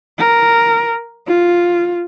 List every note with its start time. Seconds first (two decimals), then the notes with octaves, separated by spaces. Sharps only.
0.19 A#4
1.27 F4